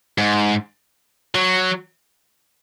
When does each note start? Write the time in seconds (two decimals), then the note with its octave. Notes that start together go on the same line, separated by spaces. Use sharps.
0.18 G#2
1.35 F#3